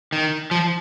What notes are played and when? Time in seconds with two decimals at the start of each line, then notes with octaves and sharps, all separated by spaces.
0.13 D#3
0.51 F3